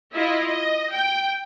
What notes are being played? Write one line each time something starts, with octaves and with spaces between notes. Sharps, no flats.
E4 F4 D#5
D#5
G5